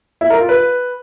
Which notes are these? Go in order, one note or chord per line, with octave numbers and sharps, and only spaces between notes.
E4
A#4
F4
B4